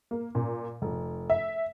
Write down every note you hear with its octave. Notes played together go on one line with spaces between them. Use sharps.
A#3
A#2
F1
E5